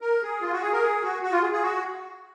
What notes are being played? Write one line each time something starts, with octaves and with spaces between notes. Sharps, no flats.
A#4
G#4
F4
F#4
G#4
A#4
G#4
F#4
F#4
F4
G#4
G#4
F#4